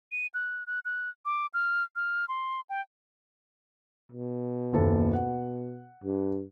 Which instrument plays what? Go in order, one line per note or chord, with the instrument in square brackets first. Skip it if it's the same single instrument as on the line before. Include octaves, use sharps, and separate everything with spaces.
[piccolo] D#7
F#6
F#6
F#6
D6
F6
F6
C6
G5
[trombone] B2
[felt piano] F#1 D#2 A4
F#5
[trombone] G2